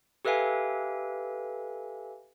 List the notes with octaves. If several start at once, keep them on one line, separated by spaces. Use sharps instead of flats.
G4 A4 B4 E5 F5 G#5